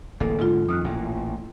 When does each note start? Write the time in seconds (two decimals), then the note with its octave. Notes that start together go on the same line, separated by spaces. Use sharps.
0.20 D1 A1 A#3 A4
0.41 G#2 D3 F4
0.69 F2 D#3 D#6 F6 F#6
0.84 A1 A#2